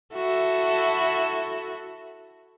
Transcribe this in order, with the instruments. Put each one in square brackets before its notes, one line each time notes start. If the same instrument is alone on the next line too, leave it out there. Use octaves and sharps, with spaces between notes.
[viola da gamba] E4 F#4 A4